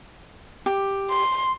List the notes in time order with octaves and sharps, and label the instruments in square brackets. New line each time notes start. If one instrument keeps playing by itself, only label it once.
[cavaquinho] G4
[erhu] C6